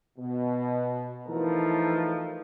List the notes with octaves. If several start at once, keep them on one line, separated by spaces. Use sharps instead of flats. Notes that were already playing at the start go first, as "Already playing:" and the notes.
B2
E3 F3 A3 D#4 A#4 B4